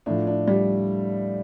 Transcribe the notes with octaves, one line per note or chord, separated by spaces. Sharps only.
A2 F3 D4
D4
G3